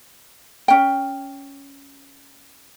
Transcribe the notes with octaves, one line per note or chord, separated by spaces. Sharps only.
C#4 G5